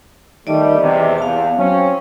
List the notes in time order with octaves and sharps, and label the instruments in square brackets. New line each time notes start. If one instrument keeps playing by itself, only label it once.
[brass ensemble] D#3 G3 A3 [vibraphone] D5 D#5 A5
[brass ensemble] E2 C3
[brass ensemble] E2 [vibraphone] F5 A5
[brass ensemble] F#3 C4 C#4